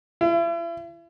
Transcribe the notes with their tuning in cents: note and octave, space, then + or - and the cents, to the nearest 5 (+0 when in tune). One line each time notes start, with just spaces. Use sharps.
E4 +40